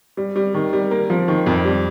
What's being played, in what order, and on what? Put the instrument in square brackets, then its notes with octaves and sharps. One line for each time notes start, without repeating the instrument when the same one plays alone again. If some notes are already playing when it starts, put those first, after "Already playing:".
[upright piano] G3
G3
D#3
G3
A#3
F3
D#3
F2
G3